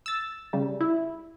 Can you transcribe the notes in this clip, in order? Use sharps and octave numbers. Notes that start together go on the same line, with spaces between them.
E6 A6
C#3 G3
E4